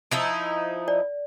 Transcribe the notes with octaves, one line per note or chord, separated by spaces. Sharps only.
F3 D#4 E4
D5